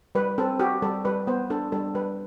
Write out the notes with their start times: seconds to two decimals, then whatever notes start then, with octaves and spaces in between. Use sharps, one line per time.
0.15 G3 B4
0.38 C4 A4
0.59 F#4 G4
0.82 G3 A4
1.05 G3 B4
1.27 B3 C5
1.50 D4 A4
1.72 G3 A4
1.95 G3 B4